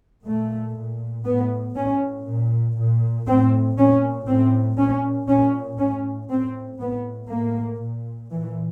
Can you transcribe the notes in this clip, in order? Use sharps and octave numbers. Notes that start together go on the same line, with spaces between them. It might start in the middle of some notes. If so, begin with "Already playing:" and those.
A#2 A3
A#2
A2 B3
A2 C#4
A#2
A#2
A2 C4
A#2 C#4
A2 C4
A#2 C#4
A#2 C#4
A2 C#4
A2 C4
A2 B3
A2 A#3
A#2
A#2 E3